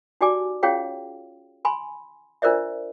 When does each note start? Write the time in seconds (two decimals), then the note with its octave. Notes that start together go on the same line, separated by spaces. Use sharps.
0.21 D#4 F#4 G4 D5 G#5 D6
0.63 C#4 F4 G#4 C#5 F5 G5
1.65 G#5 B5 C6
2.42 D4 F4 A#4 C5 D5 E5